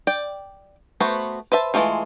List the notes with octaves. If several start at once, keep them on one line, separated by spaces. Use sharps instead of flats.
D5 G5
A3 B3 F#4 B4 C5
B4 C5 E5 A5
E3 F3 G#3 A3 F4